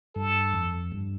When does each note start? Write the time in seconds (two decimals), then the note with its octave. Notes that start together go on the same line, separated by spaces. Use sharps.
0.15 G2 A4
0.54 F2
0.92 G2